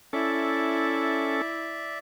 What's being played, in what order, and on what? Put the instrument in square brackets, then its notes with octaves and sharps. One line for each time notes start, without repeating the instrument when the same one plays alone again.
[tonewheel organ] C#4 A4 [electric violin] E4 [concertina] D5 E5